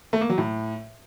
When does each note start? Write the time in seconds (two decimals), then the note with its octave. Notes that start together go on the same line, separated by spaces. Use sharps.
0.13 A3
0.21 A#3
0.30 F#3
0.38 A2